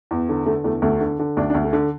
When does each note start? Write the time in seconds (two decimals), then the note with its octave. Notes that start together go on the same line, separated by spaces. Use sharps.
0.11 E2
0.29 D3
0.46 D3 A3
0.64 E2 A3
0.82 D2 A3
1.01 D3
1.19 D3
1.37 D2 D4
1.50 D4
1.55 D2
1.64 A3
1.73 D3